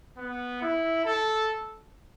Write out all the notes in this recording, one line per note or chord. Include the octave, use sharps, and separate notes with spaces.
B3
E4
A4